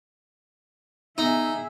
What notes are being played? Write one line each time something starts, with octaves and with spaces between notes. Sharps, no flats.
B3 D#4 G#4 E5